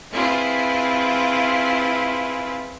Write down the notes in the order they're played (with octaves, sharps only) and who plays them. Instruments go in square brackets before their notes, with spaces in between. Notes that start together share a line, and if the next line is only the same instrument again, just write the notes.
[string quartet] C4 E4 F4 G#4 B4